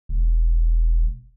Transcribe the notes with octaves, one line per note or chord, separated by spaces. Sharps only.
E1